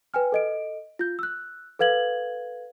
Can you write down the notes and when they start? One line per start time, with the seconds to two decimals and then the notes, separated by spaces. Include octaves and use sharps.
0.14 B4 G5 G#5 F6
0.32 A4 D#5 D7
0.99 F4 G6
1.19 E6 F#6
1.79 A4 B4 F5 G#6 F#7